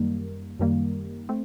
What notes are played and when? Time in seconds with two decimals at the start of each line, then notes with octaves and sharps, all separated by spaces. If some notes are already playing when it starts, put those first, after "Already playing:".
Already playing: F#2 D#3 G3 A#3
0.59 F#2 D#3 G3 A#3
1.29 A3 C4